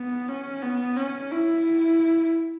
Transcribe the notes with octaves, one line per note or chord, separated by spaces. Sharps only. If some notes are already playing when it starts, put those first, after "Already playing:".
Already playing: B3
C#4
B3
C#4
E4